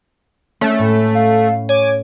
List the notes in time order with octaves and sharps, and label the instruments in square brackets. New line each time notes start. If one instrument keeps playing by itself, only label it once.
[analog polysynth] A3 [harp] C#4
[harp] A2
[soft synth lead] F5
[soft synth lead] C#5 [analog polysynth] G#5 D6